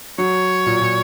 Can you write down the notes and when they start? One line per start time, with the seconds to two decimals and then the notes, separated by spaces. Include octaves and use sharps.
0.18 F#3 C#5
0.66 A#2
0.81 A#2